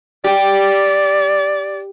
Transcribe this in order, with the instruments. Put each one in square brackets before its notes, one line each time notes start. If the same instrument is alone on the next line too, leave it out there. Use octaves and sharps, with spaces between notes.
[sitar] G4 [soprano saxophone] D5